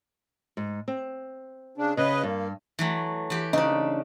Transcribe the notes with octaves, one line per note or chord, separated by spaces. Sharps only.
G#2
C4
C#3 D4
C#3 B4 D#5
G2 A#3
E3 F#3 A3
E3 G4
C#3 D4 D#4